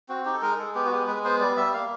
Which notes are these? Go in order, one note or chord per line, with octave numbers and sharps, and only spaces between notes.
C4 F#4
D#4 G4
A4
G#3 A#4
G#3 A4
B3 G4
F#4
G#3 G4
G#3 B4
B3 C5
G3 D5
G3 E5
A#3 F5